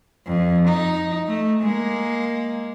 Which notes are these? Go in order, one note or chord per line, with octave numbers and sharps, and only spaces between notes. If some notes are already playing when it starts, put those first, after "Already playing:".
F2
D#4
A3
G#3 A#3